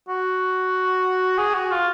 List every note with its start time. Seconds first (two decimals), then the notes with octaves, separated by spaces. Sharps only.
0.08 F#4
1.38 G#4
1.54 F#4
1.71 F4